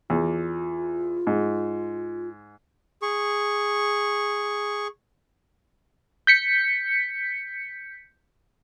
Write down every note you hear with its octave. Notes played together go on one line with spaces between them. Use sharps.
E2 F4
G#2
G#4 C#6
G6 B6 C#7